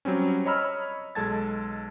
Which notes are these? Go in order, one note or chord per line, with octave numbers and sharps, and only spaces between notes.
F#3 G3 C4 C#4
C#5 D#5 A#5 B5 E6 F6
B1 G#3 A4 A5 G#6 A6